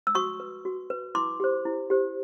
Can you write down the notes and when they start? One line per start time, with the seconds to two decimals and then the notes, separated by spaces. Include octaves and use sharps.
0.07 E6
0.15 F#4 C#6 D#6
0.40 B4
0.65 F#4
0.90 B4
1.15 E4 C6 D6
1.40 G4 C5
1.65 E4
1.90 G4 C5